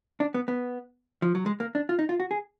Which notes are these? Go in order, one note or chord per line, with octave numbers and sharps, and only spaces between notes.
D4
B3
B3
F3
F#3
G#3
A#3
D4
F4
D#4
F4
F#4
G#4